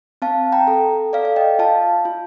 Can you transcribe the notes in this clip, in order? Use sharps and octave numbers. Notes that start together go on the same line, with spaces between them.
C4 F5 A5
G5 A#5
A4
A4 D5 F5
F5
D#5 G5
F4 F5 A5
F4